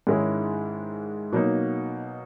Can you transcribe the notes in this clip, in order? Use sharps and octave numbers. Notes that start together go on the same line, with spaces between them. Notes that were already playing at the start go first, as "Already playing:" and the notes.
G#2 D#3 G#3 C#4 E4
B2 F#3 A#3 D#4